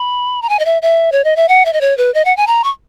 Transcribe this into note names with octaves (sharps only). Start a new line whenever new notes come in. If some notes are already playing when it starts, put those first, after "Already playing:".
Already playing: B5
A#5
G#5
D#5
E5
E5
C#5
D#5
E5
F#5
E5
D#5
C#5
B4
D#5
F#5
G#5
A#5
C#6